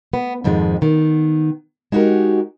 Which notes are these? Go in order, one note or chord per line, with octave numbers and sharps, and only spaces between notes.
B3
F2 G#2 D#3 F3 G#3
D#3 B3
G#3 D#4 F#4 G4 A#4